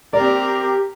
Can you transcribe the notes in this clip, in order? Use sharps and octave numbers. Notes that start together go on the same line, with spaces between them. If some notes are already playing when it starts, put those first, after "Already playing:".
C4 G4 A#4 D5